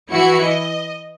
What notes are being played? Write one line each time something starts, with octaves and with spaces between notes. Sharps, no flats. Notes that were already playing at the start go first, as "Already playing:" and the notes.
E3 E4 F#4 C#7
D#5